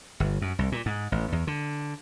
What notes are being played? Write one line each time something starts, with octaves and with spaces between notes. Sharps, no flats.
G1
F#2
C2
A#2
G#2
A1
E2
D3